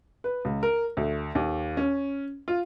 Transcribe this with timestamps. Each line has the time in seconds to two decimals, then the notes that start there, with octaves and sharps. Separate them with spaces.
0.24 B4
0.45 C#2
0.63 A#4
0.97 D2
1.35 D#2
1.77 C#4
2.48 F4